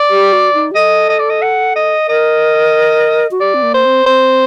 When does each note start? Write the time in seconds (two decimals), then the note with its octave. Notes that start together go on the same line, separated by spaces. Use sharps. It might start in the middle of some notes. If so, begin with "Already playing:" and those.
Already playing: D5
0.10 G4
0.33 F#4
0.54 D#4
0.71 G4
0.76 A4 D#5
1.10 D#5
1.19 D5
1.30 D#5
1.42 F#5
1.76 D#5
2.08 A#4 D#5
3.31 F#4
3.41 G4 D5
3.54 C4
3.63 A#3
3.74 C5
3.85 C4
4.06 C4 C5